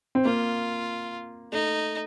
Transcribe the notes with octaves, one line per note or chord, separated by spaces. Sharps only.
C4
A#3 F4
A3 D#4